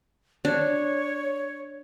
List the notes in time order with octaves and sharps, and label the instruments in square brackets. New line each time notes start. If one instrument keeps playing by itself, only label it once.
[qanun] D4 [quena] C#5